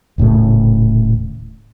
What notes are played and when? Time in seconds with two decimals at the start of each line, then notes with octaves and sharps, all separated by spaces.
0.18 D#1 A2 C#3 A3